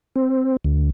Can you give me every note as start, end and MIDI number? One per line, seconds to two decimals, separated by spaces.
0.16 0.56 60
0.64 0.90 38